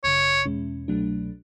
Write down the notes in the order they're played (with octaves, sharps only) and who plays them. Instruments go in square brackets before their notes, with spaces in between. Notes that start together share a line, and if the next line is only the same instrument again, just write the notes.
[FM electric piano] G#1 F#2 C#3 [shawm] C#5
[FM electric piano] E2 B2 G#3 C#4
C2 B2 F#3 A3 D4